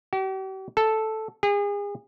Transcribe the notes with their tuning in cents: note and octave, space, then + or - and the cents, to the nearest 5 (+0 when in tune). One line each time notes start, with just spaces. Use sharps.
G4 -45
A4 -5
G#4 -35